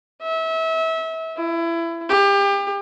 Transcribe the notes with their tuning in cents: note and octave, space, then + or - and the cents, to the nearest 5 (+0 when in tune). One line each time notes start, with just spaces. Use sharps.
E5 -30
E4 +25
G4 +30